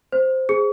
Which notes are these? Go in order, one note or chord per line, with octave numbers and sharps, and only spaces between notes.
C5
G#4